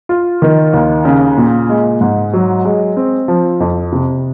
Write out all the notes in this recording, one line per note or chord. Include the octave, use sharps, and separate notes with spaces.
F4
D#3
D#2
C#3
A#2
G#3
G#2
F#3
G#3
C4
F3
F2
C3